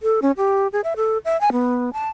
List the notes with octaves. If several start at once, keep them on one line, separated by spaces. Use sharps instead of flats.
A4
C#4
G4
G#4
E5
A4
E5
G#5
B3
A5